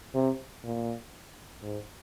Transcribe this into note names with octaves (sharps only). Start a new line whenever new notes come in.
C3
A#2
G#2